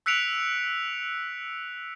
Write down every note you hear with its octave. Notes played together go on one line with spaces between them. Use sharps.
E6 F#6 B6 C#7 D7 F7